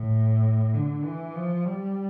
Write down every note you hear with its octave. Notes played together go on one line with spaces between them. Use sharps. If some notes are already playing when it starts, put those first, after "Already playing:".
Already playing: A2
D3
E3
F3
G3